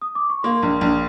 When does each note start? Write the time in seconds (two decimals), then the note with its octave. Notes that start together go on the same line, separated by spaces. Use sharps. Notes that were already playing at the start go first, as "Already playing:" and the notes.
0.02 D#6
0.15 D6
0.30 C#6
0.43 A#3 C6
0.63 A#1
0.81 A#1